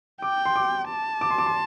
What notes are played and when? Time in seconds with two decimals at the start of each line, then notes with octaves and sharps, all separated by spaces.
0.22 G5 D6
0.46 C6
0.56 D6
0.89 A5
1.21 D6
1.31 C6
1.38 D6
1.46 C6